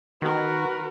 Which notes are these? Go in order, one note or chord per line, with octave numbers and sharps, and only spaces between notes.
D#3 F#4 A#4 B4